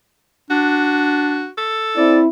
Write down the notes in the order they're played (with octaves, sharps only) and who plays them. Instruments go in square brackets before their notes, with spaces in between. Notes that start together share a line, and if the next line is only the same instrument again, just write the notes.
[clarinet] D4 [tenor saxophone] F#4
[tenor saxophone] A4
[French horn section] C4 E4 [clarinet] D5